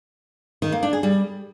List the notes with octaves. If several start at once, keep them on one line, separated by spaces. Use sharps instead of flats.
D#3
A#3
D4
G#4
G3